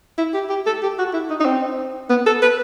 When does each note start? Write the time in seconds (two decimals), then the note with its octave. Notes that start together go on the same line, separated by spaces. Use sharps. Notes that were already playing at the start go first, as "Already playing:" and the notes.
0.18 E4
0.34 G4
0.49 G4
0.66 A4
0.83 G4
0.98 F#4
1.13 E4
1.30 D#4
1.40 D#4
1.45 C4
2.09 B3
2.26 A4
2.42 B4